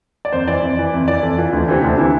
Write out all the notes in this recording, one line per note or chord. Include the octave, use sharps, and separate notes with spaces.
D5
F2 C5
E3 D5
F2
E3
F2
E3 D5
F2 A4
E3 F4
D2 D4
C3 E3 C4
D2 D4
C3 E3 E4